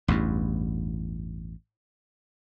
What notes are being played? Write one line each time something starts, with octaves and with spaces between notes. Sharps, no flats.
A1 E2 G2